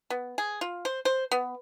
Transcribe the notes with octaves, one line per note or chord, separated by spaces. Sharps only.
B3
G#4
F4
C5
C5
B3